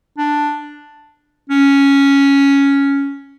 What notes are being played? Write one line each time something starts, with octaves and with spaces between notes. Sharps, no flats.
D4
C#4